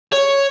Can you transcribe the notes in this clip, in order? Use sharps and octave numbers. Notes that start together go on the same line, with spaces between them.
C#5